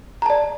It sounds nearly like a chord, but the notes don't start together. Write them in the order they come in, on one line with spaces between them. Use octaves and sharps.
A#5 A5 D5